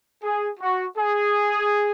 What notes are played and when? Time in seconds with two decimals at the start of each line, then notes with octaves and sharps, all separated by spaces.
0.23 G#4
0.60 F#4
0.97 G#4